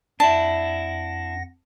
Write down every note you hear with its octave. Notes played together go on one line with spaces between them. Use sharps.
F2 D4 E4 F#5 A5 A#6